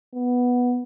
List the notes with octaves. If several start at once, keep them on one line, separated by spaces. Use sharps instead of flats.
B3